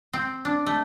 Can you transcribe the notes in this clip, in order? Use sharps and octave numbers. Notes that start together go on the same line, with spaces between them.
C4
D4
A3